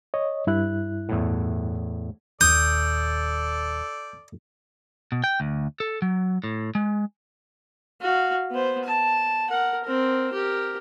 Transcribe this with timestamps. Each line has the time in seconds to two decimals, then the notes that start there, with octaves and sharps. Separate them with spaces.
0.14 C#5 D#5
0.47 G2 E4 F#6
1.09 E2 A2
2.41 D#1 D#2 A4 D5 D#6 G6
5.12 B2
5.24 G5
5.40 D2
5.80 A4
6.02 F#3
6.44 A2
6.75 G#3
8.01 F#4 F5
8.51 B3 C5
8.84 A5
9.50 A#4 F#5
9.85 C4 A#4
10.33 G4 A#4